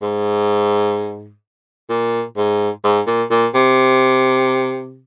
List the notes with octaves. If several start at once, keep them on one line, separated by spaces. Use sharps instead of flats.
G#2
A#2
G#2
G#2
A#2
A#2
C3